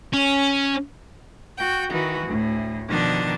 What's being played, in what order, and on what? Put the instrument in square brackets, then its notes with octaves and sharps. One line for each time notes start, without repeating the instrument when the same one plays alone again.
[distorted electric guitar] C#4
[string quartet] F#4 G5
D#3 E3 F#4
D2 A2
B2 D#3 F3 D4 D#4 A6